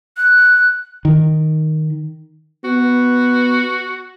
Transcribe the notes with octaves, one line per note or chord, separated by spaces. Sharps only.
F#6
D#3
B3 F#4